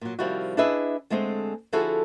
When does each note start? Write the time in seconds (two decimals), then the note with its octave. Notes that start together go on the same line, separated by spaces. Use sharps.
0.01 A#2 F#3
0.19 C3 D#3 F3 G3 E4 F#4
0.57 D4 E4 G#4 B4 D#5 E5
1.10 D3 G#3 A3 C4 G#4
1.73 D3 F3 E4 F#4 G#4 A4